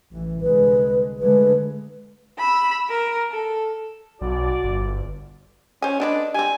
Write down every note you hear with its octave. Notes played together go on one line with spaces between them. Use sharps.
A1 E3
C2 D3 G#3 B4
D3 G#3 A3 B4
B5 E6
A#4
A4
B1 F#4 D5
G1
C#4 C5 G#5
D3 G#3 D4 B4
G3 C4 G#5